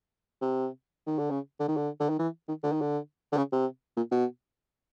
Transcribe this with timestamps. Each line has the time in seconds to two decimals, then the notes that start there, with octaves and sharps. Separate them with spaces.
0.41 C3
1.07 D#3
1.19 D3
1.30 C#3
1.60 D3
1.68 D#3
1.77 D3
2.00 D3
2.09 D#3
2.19 E3
2.49 D#3
2.63 D3
2.72 D#3
2.81 D3
3.32 D3
3.37 C#3
3.53 C3
3.97 A#2
4.11 B2